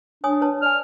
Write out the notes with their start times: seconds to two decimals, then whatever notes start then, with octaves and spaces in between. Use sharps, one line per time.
0.24 D4 C#5 G#5 D#6
0.41 B4 C#5 A5
0.62 D5 G#5 F6